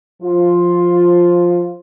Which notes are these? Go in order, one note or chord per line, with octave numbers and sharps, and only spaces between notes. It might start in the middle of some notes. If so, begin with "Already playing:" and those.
F3 F4